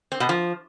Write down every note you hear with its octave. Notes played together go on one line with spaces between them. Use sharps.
C4
B2
F3